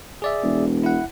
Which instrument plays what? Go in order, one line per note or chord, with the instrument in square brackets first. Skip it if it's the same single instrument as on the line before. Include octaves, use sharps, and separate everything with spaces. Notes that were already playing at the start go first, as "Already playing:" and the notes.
[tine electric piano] G#4 D5 E5
[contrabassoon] E1
[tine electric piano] E4 F#5